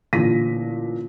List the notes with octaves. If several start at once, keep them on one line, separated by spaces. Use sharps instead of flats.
A1 A#2 D3 A#6 B6 D#7